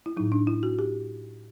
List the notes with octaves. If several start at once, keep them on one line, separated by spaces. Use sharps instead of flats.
E4
A2 F#3 D#4
D4
E4
F#4
G4